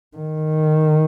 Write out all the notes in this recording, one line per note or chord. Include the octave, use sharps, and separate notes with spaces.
D#3